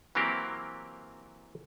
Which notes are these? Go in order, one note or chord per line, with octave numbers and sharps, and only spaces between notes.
E3 F#3 A#3 C4 G4 A#4